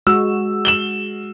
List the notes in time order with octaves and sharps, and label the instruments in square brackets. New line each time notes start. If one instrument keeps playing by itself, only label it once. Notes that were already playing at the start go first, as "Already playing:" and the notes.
[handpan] G#3 F#4 [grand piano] E6
[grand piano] E7 F#7 G7